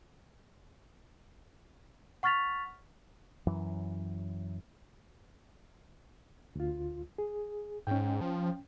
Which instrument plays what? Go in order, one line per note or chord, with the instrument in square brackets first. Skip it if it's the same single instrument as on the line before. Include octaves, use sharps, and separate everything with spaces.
[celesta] F#5 C#6 F6 A6 B6 F7
[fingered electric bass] F#2 E3 F#3
[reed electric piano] D2 F4
G#4
[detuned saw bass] G#2 [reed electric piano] C#4 G5
[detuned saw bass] F3